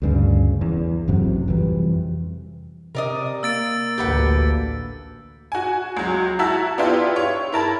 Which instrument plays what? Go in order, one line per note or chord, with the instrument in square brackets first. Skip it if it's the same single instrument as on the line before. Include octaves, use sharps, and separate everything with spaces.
[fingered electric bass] D2 G2 C#3
E2
A1 F#2 C3 F#3
F2 C3 E3 G3
[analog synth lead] C3 [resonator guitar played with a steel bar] A#4 D5 D#5
[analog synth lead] A#3 [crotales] E6 A6 D7
[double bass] A1 D2 [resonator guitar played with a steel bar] G4 B4 F#5
[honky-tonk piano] F#4 G#5
C#2 F#3
E4 F#4 E5 A5 A#5 E6
B3 D4 E4 F4 G4
C#5
E4 A#4 A5 B5